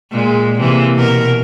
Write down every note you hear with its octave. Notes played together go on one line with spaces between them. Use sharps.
A#2 G#3
C3 E3 A#3
B2 A#4